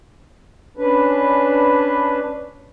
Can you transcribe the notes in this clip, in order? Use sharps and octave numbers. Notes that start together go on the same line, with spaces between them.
C#4 D4 B4